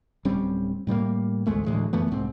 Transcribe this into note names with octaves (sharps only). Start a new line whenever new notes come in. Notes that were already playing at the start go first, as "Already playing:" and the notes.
D1 G3 C4 C#4
A2 G3 A3 A#3
A1 D2 G#3 A3
D2 A2 E3 G#3
F#2 E3 A3 B3
C2 G#2 C4